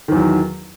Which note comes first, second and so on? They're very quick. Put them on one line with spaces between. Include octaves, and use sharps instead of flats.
D#3 E2 F#3